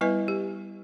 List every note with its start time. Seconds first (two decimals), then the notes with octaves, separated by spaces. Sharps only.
0.01 G3 B3 E4 B4 D#5 G#5
0.28 G4